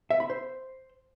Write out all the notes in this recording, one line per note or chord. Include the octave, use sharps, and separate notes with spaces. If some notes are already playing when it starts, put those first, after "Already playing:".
E5
B5
C5